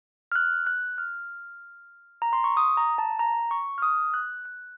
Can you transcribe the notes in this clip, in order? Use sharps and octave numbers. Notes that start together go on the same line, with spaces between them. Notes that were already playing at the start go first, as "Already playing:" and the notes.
F6
F#6
F#6
F6
A#5
C6
C#6
D#6
A#5
A5
A#5
C#6
F6
D#6
F#6
F#6